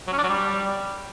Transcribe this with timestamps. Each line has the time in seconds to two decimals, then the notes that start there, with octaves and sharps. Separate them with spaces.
0.07 F#3
0.13 C#4
0.18 D4
0.23 F#3
0.29 G3